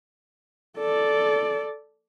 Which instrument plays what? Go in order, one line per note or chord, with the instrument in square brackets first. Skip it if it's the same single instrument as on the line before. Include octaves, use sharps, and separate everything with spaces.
[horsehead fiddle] A4 D5